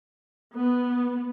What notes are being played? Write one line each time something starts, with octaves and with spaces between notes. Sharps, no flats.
B3